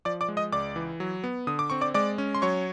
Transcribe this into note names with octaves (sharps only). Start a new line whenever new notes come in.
F3 D5 D6
D5 D6
G#3
D#5 D#6
C#2 D5 D6
E3
F#3
B3
D3 D#6
D6
C4 C#6
D5 D6
G#3 D5 D6
C#4
C6
F#3 C#5 C#6